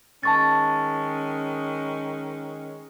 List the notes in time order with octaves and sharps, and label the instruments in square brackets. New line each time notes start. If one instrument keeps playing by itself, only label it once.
[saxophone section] D#3 G#3 C#4 [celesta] A5 C#6 A6